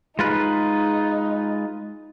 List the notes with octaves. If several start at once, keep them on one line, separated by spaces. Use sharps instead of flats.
G#3 D#4 F4 B4